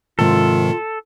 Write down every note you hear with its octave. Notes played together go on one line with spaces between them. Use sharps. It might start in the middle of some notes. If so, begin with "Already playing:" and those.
G#2 C3 D#3 F3 F4 A4